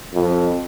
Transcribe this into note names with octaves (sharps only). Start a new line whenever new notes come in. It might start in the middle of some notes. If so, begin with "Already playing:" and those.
F2